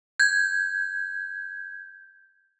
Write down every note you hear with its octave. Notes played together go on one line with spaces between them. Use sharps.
G6 G#6